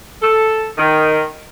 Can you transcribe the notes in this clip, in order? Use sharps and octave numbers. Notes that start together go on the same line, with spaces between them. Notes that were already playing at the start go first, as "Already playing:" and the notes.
A4
D#3